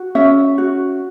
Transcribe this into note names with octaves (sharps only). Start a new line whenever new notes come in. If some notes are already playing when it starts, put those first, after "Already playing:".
Already playing: F#4
C#4 E5
F#4